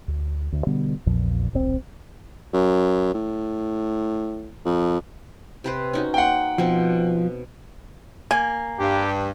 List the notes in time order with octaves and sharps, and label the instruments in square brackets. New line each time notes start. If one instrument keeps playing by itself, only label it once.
[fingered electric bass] D2
D2
B2 D3 G3 B3
A#1 E2 A#2 F3
D1 A#1 A#2 C4
[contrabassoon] F#2
A2
F2
[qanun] C3 B4 C5
C#4 D#4 F#4
[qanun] A#3 C6 [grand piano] F#5 G5
[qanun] B2 C4 [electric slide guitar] F3
[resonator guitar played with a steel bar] A#3 [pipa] G#5
[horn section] G2 [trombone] G4